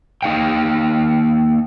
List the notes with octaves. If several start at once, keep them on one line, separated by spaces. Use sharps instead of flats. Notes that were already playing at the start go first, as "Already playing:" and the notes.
A#3 D#4 F5 G5